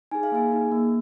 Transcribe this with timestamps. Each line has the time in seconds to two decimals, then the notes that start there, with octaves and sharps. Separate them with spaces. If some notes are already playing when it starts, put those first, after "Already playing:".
0.11 D#4 G#4 G#5
0.23 F5
0.32 A#3 G#4 G#5
0.52 D#4 G#4
0.72 A#3